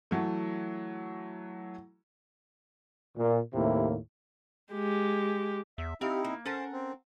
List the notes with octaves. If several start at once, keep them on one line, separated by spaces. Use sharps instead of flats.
E3 F#3 A3
A#2
D#2 A2 C3 A#3 E4
G#3 G4
E2 E5
C4 D#4 E4 G4 F5
A#3
C#4 A4 A#4 C5 F#5 A5
C4